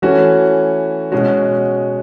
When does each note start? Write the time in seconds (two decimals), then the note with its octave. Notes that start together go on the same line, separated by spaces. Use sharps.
0.02 E3 A3 C#4 F#4
1.12 B2 G#3 C#4 F#4